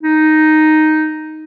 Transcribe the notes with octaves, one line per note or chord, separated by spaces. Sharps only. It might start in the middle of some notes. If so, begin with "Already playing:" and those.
D#4